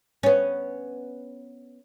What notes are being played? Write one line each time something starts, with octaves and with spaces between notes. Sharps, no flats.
B3 C#4